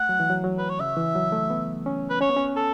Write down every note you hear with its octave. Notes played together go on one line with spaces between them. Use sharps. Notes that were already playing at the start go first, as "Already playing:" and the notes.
Already playing: A3 F#5
F#3
E3
F#3
F#3
B4
C#5
C#3 E5
E3
F#3
A3
B3
C#4
B4
C#4 C#5
B3
C#4
A4